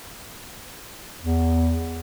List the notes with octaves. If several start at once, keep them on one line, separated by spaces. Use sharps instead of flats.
E2